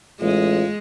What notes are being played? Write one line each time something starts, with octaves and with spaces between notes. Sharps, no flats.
A1 G#3 F4